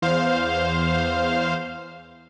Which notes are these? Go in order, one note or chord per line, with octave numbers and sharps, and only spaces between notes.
E2 C5 F5